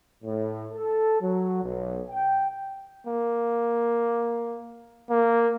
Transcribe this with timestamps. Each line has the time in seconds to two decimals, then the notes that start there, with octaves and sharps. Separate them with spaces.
0.24 A2
0.74 A4
1.21 F#3
1.63 B1
2.09 G5
3.07 A#3
5.10 A#3